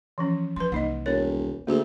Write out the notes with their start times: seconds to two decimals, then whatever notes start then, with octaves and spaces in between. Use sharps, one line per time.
0.18 E3 F3 C#4
0.56 F3 B4 C6
0.72 C2 A#3 D#4 D#5
1.06 E1 A#4 C#5
1.67 D2 A#3 G#4